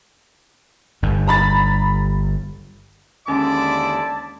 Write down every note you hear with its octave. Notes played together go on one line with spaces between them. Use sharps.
G1 G2
A#5 B5 A6
D#2 D3 G#3 C#4 E4 D5 A5 D6